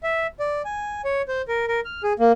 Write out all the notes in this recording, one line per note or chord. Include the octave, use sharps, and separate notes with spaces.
E5
D5
G#5
C#5
C5
A#4
A#4
F6
G#4
A#3